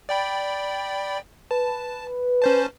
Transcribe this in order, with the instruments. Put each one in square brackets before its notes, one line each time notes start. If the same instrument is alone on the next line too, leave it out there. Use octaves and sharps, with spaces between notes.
[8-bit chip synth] D5 G5 B5
[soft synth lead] B4 [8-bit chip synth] A5
[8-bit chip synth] C#4 C5 A5